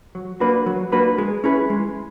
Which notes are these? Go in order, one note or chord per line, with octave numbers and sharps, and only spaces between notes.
F#3
A#3 D4 F#4 B4
F#3
A#3 D4 F#4 B4
G#3
C#4 E4 G#4 B4
G#3